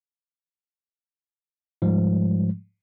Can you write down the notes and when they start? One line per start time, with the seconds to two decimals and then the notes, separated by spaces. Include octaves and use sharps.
1.82 G#2 F3 G3 G#3